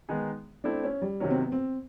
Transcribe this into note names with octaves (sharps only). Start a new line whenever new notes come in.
D#3 G#3 B3 D#4 G#4
A3 C4 D4 E4
C#4
G3
C3 D#3 F#3 C#4
C4
B3
C4